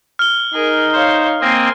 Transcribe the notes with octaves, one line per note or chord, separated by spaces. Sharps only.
F6 G7
D#4 G#4 A#4
C5 C#5 F5
A#3 C4 D#5 G#5 C6